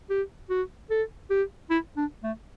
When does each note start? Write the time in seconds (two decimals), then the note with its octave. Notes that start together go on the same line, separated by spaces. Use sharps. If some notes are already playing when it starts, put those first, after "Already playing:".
0.10 G4
0.50 F#4
0.90 A4
1.30 G4
1.70 E4
1.97 D4
2.24 A3